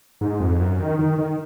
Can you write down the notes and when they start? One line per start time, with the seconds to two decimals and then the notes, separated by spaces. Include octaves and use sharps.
0.21 G#2
0.40 F2
0.60 F#2
0.80 D#3
0.99 D#3
1.19 D#3